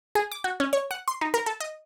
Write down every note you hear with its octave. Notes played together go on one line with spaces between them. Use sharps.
G#4
D6
F#4
C#4
C#5
F#5
C6
D#4
A#4
A4
D#5